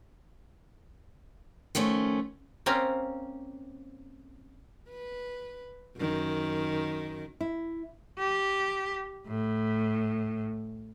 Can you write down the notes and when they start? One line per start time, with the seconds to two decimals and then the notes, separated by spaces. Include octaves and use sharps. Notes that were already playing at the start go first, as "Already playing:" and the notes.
1.75 D#3 F3 A3 C#4
2.66 A#3 C4 C#4 F5 A#5
4.89 B4
5.98 F#2 D#3
7.41 E4
8.18 G4
9.27 A2